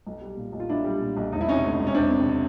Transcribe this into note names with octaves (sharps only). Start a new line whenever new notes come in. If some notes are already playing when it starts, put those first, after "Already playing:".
B1
G3
A#2
B1
F4
B1 D4 E4
G3
A#2
B1
E1 D#4
E4
C3 C#4 D#4
D2
E1
C#4
E1 C4 D4
C3